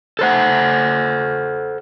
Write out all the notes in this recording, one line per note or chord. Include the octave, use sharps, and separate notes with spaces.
A4 C5 F#5